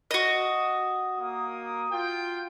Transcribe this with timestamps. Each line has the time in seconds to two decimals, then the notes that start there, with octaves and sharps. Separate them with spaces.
0.11 F#4 D#5
1.18 A#3 D#6
1.92 F4 G5